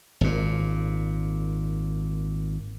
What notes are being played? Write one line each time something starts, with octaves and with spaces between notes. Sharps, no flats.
G#1 A#2